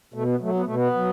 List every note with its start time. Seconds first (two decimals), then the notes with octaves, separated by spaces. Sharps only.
0.14 B2 A3
0.27 B3
0.41 F#3 A3
0.54 B3
0.64 B2 A3
0.75 B3
0.94 F#3